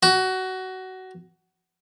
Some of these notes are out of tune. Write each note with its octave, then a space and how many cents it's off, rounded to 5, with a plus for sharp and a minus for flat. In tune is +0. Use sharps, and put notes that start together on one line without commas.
F#4 +20